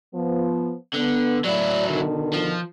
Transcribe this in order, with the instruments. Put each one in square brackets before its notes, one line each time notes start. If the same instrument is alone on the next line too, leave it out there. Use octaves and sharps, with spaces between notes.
[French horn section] F3 B3
[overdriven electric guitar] D3 [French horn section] B3
[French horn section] A2 D5 [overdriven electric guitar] F#3 E4
[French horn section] B2 D3 D#3
[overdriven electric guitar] F3